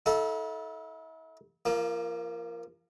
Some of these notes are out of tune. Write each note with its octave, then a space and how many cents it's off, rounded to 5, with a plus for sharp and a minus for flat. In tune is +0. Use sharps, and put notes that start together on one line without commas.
E4 -40 A4 -5 F5 +40
F3 -30 A#3 +5